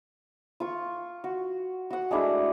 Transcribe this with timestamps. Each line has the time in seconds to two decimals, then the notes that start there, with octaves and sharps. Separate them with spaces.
0.60 F4 C#6
1.24 F#4
1.90 F#4 F#5
2.11 G#3 A3 D4 E4